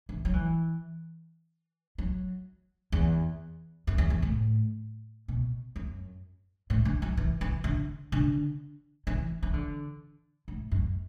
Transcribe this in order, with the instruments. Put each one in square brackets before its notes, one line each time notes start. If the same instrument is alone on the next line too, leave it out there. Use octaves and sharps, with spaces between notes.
[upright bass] E3
F#3
E3
F#3
E2
F#2
E2
E2
A2
B2
F#2
A2
D3
F#3
E3
E3
D3
D3
E3
E3
D3
A2
F#2